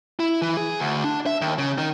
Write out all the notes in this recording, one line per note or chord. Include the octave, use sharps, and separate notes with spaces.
E4
E3
G#4
D2
D4
E5
D#2
C#3
D#3